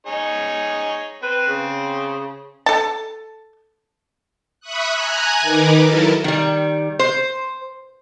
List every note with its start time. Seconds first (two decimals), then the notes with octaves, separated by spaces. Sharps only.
0.07 D#4 G#4 C#5
1.23 C4 B4
1.48 C#3
2.66 A4 A5
4.60 E5 B5 C#6 D#6 F#6
4.93 G#5 A#5 F#6 G#6
5.41 D#3 D#4 A#4 B4 D6
5.81 F#3 E4 A4 A#4 A6
6.24 D#3 G3
6.99 C5